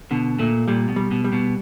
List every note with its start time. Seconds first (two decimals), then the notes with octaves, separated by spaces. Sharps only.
0.11 B2 D3
0.39 A#2 A3
0.68 A#2 G3
0.89 B2
0.96 G3
1.11 B2
1.24 G3
1.33 B2